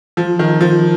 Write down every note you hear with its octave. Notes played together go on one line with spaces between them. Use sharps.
F3
D#3
F3